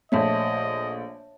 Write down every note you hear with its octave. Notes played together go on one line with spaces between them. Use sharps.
A#1 A3 C#5 D#5 E5 A5